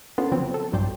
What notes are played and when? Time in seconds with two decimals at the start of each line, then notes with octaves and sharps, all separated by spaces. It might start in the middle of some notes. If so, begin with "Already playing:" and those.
0.18 A#3 B3 C#4 D4 F4 A4
0.32 C#3 F3 F#3 B3 C4
0.54 A4
0.72 A#1 G2 F#3 C5 D5 G5